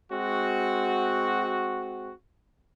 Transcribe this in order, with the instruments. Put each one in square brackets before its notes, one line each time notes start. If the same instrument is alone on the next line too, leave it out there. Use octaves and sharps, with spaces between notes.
[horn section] G#3 C4 F#4